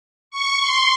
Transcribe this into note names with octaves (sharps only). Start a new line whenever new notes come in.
C#6
C6